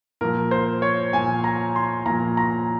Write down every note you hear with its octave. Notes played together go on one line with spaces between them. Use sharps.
A#2 F3 A#4
C5
C#5
A#2 F3 G#5
A#5
C6
A#2 F3 A#5
A#5